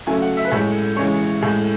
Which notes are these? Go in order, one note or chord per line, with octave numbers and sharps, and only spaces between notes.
C#3 F#3 A3 G#5
F#5
E5
B4
A2 G#3 C#5
C#3 E3 G#3 C#5
A2 G#3